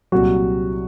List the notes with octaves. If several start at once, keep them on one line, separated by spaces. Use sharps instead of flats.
C2 A#2 F#3 F#4